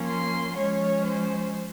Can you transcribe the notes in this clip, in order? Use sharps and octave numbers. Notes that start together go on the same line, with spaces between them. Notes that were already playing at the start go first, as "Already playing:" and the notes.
Already playing: F3 A#3 C#4
C6
F3 G#3 C#4 C#5
C5